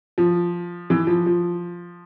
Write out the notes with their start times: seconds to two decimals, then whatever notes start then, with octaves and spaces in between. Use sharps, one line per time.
0.18 F3
0.90 E3
1.07 F3
1.26 F3